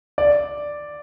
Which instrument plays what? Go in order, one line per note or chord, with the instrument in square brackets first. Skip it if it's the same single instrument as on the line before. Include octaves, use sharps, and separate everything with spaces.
[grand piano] D5